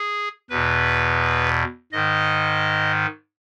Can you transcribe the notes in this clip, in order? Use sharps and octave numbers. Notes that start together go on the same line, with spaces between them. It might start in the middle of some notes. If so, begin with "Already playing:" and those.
Already playing: G#4
E2 B2 B4
G#2 D#3 D#5